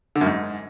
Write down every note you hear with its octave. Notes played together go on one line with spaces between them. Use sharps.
D3
F#2
G#2